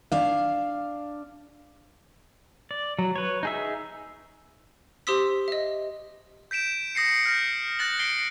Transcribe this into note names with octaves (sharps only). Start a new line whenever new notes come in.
D4 F5
D5
F#3
B4 C#5
D#4 G#4 E5
G4 C5 C6 D#6 E6 B6
D#5 E5
G6 B6 D7 E7
D#6 A#6 C7 C#7
F6 G6 A#6
F#6 A6 A#6 F#7
C7 D7 G7